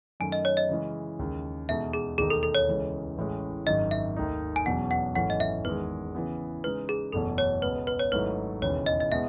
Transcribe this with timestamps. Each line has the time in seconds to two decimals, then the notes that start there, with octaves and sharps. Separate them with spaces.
0.20 F#2 D#3 A3 G#5
0.32 D#5
0.45 C#5
0.57 D#5
0.69 C#3 E3 G#3 C#4
1.19 D#2 C#3 G#3
1.69 E2 B2 G#3 D#4 A4 E5
1.93 G#4
2.18 E1 D#2 D#3 A3 D#4 G#4
2.30 A4
2.43 A4
2.55 C#5
2.68 C#2 C#3 E3 G#3
3.17 A1 A2 E3 G#3 C#4
3.66 G#1 F#2 D#3 D#5
3.91 E5
4.16 D#2 D#3 A3 D#4
4.56 G#5
4.66 E1 E2 B2 F#3 C#4 F#5
4.91 F#5
5.15 G#1 F#2 E3 A3 C#4 F#5
5.30 D#5
5.40 E5
5.64 E2 D#3 G#3 B4
6.15 C#3 E3 B3
6.64 C#3 G#3 D#4 B4
6.89 G#4
7.12 F#1 E2 B2 A3 C#4 A4
7.38 C#5
7.62 C#2 B2 G#3 B3 B4
7.87 B4
7.99 C#5
8.12 G#1 G#2 F#3 A3 E4 B4
8.62 E1 D#2 C#3 E3 C#5
8.86 D#5
9.00 D#5
9.11 B2 G#3 B3 E4 E5